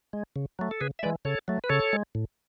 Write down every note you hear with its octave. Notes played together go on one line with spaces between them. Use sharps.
G#3
C#3
F#3 A3
A4
C#3 G#4 B4
E5
E3 G#3 B4 D5
C#3 A4 C#5
F#3 A3
B4
C#3 A4 C#5
G#3
A2